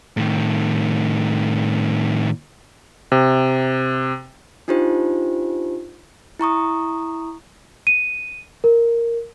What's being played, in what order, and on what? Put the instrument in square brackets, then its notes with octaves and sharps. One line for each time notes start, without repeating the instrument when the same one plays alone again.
[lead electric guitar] A2 D#3
[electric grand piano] C3
[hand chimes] D4 D#4 F4 G4 C5
E4 A#5 C#6 D#6
[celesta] D#7
A#4